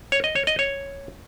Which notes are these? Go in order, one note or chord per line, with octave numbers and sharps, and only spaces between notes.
C#5
D#5
C#5
D#5
C#5